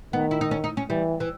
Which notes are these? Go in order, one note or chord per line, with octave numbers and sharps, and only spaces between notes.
D#3 B3
E4
D#4
C#4
D#4
C#4
E3 G3
E3